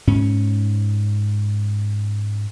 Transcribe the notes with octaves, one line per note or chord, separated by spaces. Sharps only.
G#2 C#4